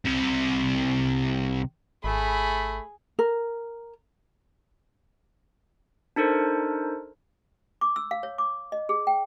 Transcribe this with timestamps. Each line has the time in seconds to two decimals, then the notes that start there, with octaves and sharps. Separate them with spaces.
0.05 C2 C3
2.04 G#1 A3 G#4 B5
3.19 A#4
6.16 D4 D#4 A4 A#4 C5
7.81 D6
7.96 E6
8.11 F5
8.23 C#5
8.38 D6
8.72 D#5
8.89 G#4
9.07 G5